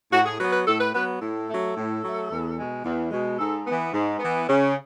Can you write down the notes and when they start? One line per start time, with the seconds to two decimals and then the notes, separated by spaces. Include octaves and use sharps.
0.11 A2 F#4
0.26 G#4
0.38 F#3 B3 B4
0.52 B4
0.66 A2 A4
0.80 B4
0.93 F#3 B3 B4
1.20 A2 A4
1.48 F#3 A3
1.75 A2
2.02 F#3 A3
2.30 E2
2.56 B2 G#3
2.84 E2
3.11 B2 G#3
3.39 G#2 A4
3.65 E3 B3
3.93 G#2
4.19 E3 B3
4.47 C#3